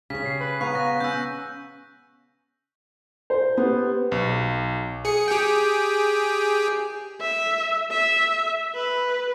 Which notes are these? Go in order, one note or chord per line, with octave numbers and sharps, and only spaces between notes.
C#3 G4 C#5 B6
C7
B4
B3 F5 A#5 C#6 F#6
A#6
C#4 E6 G6
C5
B3 G4
B1
G#4 C#7
G4 G#4 G5
E5
E5
B4